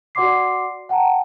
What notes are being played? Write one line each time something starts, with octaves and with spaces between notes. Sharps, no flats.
F#4 D5 F#5 C6 D6 C7
F#5 G5 A5 A#5